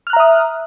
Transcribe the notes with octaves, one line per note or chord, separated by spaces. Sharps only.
E5 A#5 D#6 F6 F#6